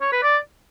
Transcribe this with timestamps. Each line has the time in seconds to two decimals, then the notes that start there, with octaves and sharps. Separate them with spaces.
0.01 C#5
0.12 B4
0.23 D5